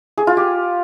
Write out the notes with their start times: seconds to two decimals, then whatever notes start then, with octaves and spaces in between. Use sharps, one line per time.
0.18 G#4
0.27 F4
0.37 G4